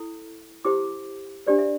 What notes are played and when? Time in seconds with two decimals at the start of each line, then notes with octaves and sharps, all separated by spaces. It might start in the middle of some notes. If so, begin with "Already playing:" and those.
Already playing: E4 A4
0.65 E4 G4 C5 D6
1.47 D4 G4 C5 D5
1.58 E5